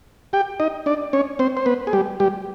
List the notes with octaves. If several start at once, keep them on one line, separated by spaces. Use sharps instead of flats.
G4 G5
D#4 D#5
D4 D5
C#4 C#5
C4 C5
C5
B3 B4
G#4
G3 G4
G3 G4